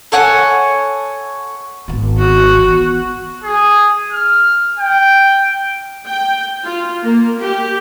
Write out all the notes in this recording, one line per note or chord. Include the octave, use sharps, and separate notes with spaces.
A4 C#5 F#5 G#5
G#1 B3
F#4
E3 B3
G#4
F6
G5
G5
F4
A#3
G4